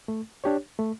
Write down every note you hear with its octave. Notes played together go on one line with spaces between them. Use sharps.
A3
D4 G4 C#5
A3